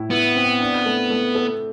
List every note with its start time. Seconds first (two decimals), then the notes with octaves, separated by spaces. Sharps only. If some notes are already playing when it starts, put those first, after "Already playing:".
Already playing: A2 E4
0.11 B3 E4
0.36 C4
0.60 D4
0.86 A3
1.10 A3
1.35 A4